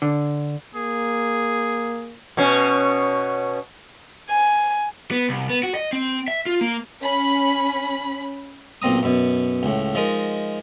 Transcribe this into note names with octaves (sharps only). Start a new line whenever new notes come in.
D3
A#3 G#4
B2 C#4
G#5
B3
C2
B3
F#4
D#5
C4
E5
F4
A#3
C#4 B5
B1 A#2 C4 A#5 D#6
F#2 B2
C#2 A2
F3 G#3 D#4 A#4